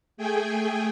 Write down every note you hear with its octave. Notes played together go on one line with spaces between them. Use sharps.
A3 G#4 G5 G#5